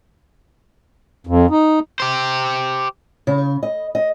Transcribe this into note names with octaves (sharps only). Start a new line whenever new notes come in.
F2
D#4
G4 C5
C#3
D#5
D#5